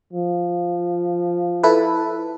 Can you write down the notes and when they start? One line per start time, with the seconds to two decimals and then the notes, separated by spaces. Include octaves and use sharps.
0.13 F3
1.63 E4 A4 B4